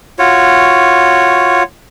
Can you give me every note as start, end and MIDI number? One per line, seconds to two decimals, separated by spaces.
0.19 1.63 65
0.19 1.63 66
0.19 1.63 73